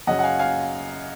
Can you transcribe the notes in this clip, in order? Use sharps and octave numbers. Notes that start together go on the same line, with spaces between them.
F#2 C#3 F#3 C#4 D#5 F#5
F#5
F5 G#5
F5 G#5